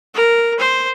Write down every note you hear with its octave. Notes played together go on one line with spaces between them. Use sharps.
A#4
C5